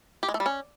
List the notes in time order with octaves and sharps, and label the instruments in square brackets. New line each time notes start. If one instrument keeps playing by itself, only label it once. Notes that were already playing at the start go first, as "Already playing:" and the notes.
[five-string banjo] G4
G#3
A3
G3
C#4